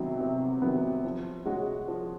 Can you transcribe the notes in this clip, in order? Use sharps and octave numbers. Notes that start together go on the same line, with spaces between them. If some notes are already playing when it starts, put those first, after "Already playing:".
Already playing: C3 D#3 F#3 B3
C3
D#3 F#3 B3
F3
G#3 C#4 F#4
F3